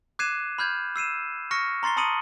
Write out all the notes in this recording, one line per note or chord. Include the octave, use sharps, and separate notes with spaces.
D6 F#6 G#6 C7 D#7 E7
B5 F6 G6 G#6
E6 C7 D#7 E7
C#6 F6 A#6 C#7
A#5 C6 A6 C7 G7
A5 B5 D#6 C#7 D#7 F#7